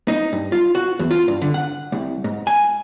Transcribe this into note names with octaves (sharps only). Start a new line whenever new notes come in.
D#4
G2
F4
F#4
E2
F4
G2
D3
F#5
C2
G#2
G#5